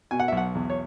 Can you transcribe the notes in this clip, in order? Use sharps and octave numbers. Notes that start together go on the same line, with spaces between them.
B2 G#5
F#5
E5
B1
F#5
E2
C#5